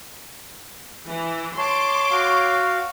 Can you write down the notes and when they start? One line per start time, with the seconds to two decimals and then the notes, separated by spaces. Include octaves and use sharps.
1.08 E3
1.58 C#5 A5 C6 D6
2.11 F#4 F5